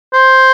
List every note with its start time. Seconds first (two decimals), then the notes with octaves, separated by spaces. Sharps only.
0.13 C5